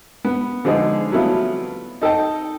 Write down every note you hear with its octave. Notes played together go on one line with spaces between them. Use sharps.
B3
D3 F3 G#3 D#4 G#4
F#3 G3 A3 B3 E4 F4
D#4 A4 D#5 G5